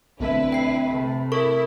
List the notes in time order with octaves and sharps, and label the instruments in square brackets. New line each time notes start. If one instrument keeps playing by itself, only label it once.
[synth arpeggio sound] B1 A3 E5 [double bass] D3 C4 [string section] E4 B4
[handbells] G5 C7
[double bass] C3 A3 [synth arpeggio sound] B5
[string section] E4 [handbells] A4 A#4 C#6